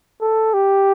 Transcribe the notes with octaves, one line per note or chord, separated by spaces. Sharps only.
A4
G4